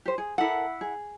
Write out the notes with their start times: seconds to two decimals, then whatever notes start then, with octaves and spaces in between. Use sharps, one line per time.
0.06 G4 C5
0.18 G#4
0.38 E4 A4 A#4 F#5
0.81 G#4